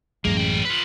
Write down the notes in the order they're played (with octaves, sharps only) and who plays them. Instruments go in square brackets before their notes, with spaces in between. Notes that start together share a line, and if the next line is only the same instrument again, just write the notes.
[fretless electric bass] A1 F#2 G#3 [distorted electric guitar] A#3
[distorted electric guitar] F#3 G5
F4 B4